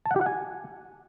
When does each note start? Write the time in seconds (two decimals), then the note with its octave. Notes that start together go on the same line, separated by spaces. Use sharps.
0.06 A5
0.11 F#5
0.16 G4
0.21 F#5
0.26 G#5